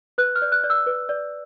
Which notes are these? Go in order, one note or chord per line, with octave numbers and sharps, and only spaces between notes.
B4 F#6
F6
D5
F#6
D5
E6
B4
D5